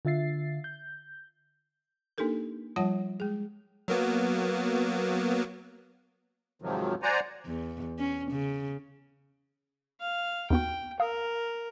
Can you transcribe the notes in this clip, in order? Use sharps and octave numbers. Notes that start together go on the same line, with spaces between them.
D3 F4 E5 A6 C7
G6
A#3 D4 D#4 G4 A4 A#4
F3 G3 F4 C#5 F#5 A5
G#3 G#4
F#3 A#3 B3
G#2 C3 D#3 F3 F#3
C5 D5 F#5 G#5 A#5
E2
C#4
C#3
F5
D#2 B3 F#4 G5
A#4 F5 D#6 E6